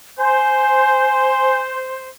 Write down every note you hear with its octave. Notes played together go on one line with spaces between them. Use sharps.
C5 G#5